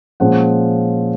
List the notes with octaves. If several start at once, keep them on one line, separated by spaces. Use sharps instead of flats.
A#2 F3 G#3 C#4 F#5